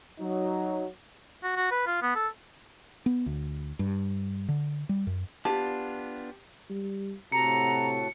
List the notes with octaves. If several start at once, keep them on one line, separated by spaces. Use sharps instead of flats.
F#3 D#4
F#4
F#4
B4
F4
B3
A4
B3
D2
G2
D3
G3
F#2
B3 D4 F4 G4 A5
G3
A2 C3 F#4 A4 A#5 C#7